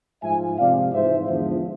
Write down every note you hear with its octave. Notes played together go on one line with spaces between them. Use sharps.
G#2 F3 E5 G#5
F2 C3 F3 D5 F5
G#2 E3 C5 E5
E2 D3 F3